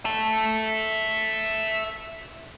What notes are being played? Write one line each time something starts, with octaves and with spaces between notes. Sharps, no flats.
E5 A5